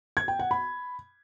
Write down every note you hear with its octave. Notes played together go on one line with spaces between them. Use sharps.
G#6
G5
F#5
B5